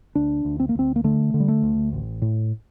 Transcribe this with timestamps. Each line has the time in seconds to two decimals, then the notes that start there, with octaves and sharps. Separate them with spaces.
0.15 D2 D4
0.45 D2
0.60 C4
0.69 A#3
0.75 D2 C4
0.96 A#3
1.04 D3 A3
1.34 D3
1.40 G3
1.48 A3
1.63 D2
1.93 A1
2.22 A2